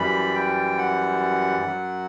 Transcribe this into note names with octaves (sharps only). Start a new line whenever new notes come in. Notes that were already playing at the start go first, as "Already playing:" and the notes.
Already playing: F#2 E3 G3 B5
G5
F#5
F#2 F#3